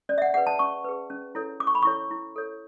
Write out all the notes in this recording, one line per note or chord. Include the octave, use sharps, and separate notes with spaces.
C#4 D5
E5
F#5
G#4 B4 F#5
A5
C#4 C#6
G#4 B4
C#4
E4 A4 C#5
C#4 D6
C#6
B5
E4 A4 C#5 C#6
E4
A4 C#5